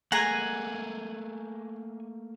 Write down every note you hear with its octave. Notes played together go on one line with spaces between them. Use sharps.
A3 A#3 G#4 F#5 G#5 A#5